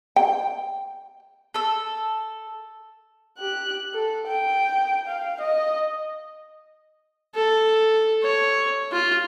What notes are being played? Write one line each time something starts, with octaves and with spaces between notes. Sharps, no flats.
G5
A4 E6
G4 F#6
A4
G5
F5
D#5
A4
C#5
F4